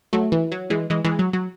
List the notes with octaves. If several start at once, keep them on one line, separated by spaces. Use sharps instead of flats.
F#3 A3
E3
F#3
E3 G#3
E3 G#3
E3 G#3
F#3
F#3